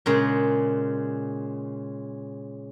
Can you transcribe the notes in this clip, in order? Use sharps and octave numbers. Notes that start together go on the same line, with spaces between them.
A#2 C#3 G#3